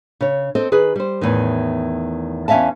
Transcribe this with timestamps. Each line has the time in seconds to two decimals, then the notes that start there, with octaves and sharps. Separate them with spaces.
0.21 C#3 C#5
0.55 C4 A4 C5 D#5
0.72 D#3 G#4 B4
0.96 G3 C5
1.21 E2 A2 D#3
2.48 E2 C#4 E5 F5 A5